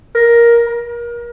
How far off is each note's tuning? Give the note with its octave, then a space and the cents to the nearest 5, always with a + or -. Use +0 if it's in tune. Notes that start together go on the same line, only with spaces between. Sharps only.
A#4 +10
A#4 +30